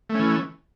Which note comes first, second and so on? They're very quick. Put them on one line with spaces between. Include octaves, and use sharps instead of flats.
A3 C#4 E3